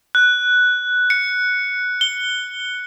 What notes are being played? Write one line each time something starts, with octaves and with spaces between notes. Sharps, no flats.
F#6
C#7
G7